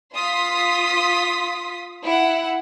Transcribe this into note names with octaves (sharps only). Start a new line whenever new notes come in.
F4 C6 D#6 B6
E4 F#5